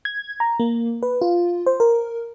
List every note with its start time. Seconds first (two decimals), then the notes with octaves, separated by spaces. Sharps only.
0.05 G#6
0.40 A#5
0.60 A#3
1.03 B4
1.21 F4
1.66 C5
1.80 A#4